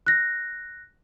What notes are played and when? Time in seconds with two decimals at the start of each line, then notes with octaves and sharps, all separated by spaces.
0.07 F#6 A#6